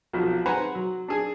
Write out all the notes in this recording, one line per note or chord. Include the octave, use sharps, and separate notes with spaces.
B1 F3 F#3
B4 C5 F#5 G#5 A#5 B5
F#3
D4 G#4